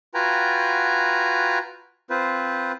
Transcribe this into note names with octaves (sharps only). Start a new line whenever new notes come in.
F4 F#4 B4 G5 G#5 A#5
C4 F4 B4 C5